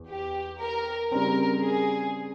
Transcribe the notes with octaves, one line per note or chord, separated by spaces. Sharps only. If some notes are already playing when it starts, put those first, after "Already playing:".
Already playing: E2
G4
A#4
C#3 G3 C4 A#4
G#4